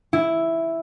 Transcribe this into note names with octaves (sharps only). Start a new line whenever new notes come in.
E4